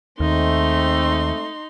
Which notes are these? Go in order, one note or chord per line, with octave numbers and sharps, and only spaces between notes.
D#2 G#3 A3 C4 D#4 C6